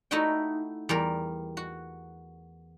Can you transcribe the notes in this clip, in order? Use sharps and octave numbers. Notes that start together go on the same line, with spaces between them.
A3 D#4 E4 F#4 D#5 G5
E2 G3 A#4
F#4